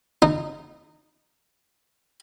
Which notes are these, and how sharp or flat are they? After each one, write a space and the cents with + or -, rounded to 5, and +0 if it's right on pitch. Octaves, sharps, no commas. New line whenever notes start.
D#4 -25